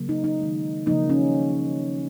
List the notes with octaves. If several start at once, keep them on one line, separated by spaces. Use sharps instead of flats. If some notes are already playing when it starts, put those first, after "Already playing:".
Already playing: C#3 F#3 A#3
D#4
D#4
D#3 G#3
C#3 F3 A#3 D#4
C#4